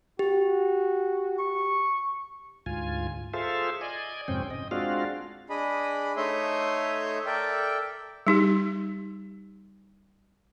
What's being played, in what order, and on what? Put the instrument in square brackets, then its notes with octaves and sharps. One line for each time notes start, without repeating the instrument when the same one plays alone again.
[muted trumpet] F#4 [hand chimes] G4
[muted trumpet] C#6
[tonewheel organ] D2 G#2 F4 G#5
F4 G#4 A4 C5 E5 F5
D5 D#5 G#5
F2 G#2 C3 C4 C#4 G5
D#5
G#3 C4 D4 F4 F#4 F5
[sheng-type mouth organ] D4 G#4 D#5 B5
A3 D#4 C#5 E5 C6 D#6
A4 A#4 D5 E5 G5
[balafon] G3 D#4 G4